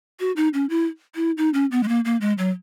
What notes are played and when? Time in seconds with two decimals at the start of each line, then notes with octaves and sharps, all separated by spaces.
0.20 F#4
0.36 D#4
0.54 C#4
0.70 E4
1.15 E4
1.38 D#4
1.54 C#4
1.71 B3
1.83 G#3
1.88 A#3
2.05 A#3
2.21 G#3
2.38 F#3